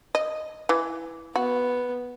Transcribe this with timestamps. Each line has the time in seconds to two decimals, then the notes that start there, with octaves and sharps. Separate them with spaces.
0.15 D#5
0.69 E3
1.36 B3 F#4